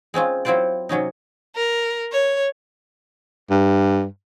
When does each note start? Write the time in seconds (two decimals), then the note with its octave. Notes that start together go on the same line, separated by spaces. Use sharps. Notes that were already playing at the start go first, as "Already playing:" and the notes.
0.14 G#3 C4 C#4 F4
0.45 F#3 C4 E4 F4 C5 D5
0.89 C3 F#3 C#4 D#4
1.56 A#4
2.12 C#5
3.50 G2